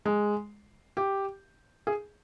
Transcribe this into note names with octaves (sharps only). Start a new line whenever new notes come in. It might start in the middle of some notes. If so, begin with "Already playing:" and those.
G#3
G4
G#4